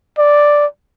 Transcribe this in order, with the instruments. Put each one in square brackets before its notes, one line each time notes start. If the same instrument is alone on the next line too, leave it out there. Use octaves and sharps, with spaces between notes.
[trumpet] D5